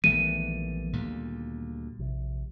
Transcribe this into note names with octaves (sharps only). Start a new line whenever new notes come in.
A#1 D#3 E3 G3 A3 B3 D#7
D2 A#2 G3
A#1 C3